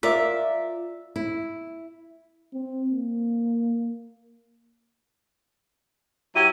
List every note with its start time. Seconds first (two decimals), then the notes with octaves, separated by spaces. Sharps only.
0.03 F4 A#4 D5 E5
1.16 E4
2.53 C4
2.90 A#3
6.36 F#3 E4 G4 D#7